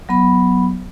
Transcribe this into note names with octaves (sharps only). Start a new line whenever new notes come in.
F#3 B3 B5